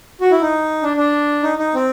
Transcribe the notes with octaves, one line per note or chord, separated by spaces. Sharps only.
F#4
E4
D#4
D4
D4
D#4
D#4
C4